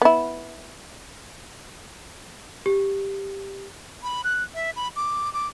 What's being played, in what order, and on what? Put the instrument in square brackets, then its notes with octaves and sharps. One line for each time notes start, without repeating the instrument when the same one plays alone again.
[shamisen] B3 E4
[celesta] G4
[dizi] B5
F#6
E5
B5
D6
D6